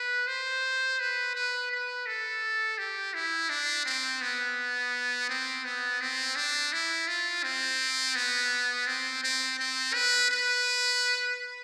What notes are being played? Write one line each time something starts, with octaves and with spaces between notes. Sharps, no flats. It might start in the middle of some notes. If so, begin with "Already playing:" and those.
Already playing: B4
C5
B4
B4
B4
A4
G4
E4
D4
C4
B3
C4
B3
C4
D4
E4
F4
C4
B3
C4
C4
C4
B4
B4